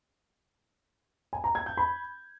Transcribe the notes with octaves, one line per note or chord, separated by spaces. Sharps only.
G#5
A#5
G#6
G6
B5